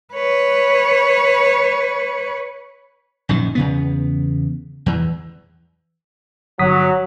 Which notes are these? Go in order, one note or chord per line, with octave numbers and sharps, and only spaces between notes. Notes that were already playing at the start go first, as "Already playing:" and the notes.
B4 C#5
A#1 F#2 D#3
E2 C#3 B3
E2 E3
G1 F#3 D#6 B6